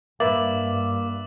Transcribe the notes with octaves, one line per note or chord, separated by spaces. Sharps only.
G2 A#3 B4 E5 D6 A6 F#7